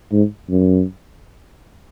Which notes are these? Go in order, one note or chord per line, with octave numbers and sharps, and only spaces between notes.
G#2
F#2